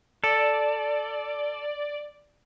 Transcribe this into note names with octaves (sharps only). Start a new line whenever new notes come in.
A4 D5